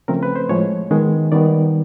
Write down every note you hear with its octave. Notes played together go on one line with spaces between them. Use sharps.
C#3 F3 A3 C4 A#4
B4
C5
A2 F3 G#3 C#5
D#3 G#3 B3
D#3 G3 B3 D5